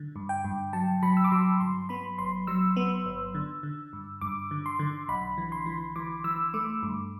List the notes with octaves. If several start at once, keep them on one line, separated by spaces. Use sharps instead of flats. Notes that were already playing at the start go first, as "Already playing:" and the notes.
Already playing: D3
G2
G5
G2
F#3 A5
F#3 B5
E6
D6
F#3 C6
G2 C6
B3 B5
G1 C6
F#3 E6
B3
G1
D3
D3
G2
G2 D6
D3
C6
D3
B1 B5
E3
C6
E3
E3 D6
E3 E6
A3 D6
G2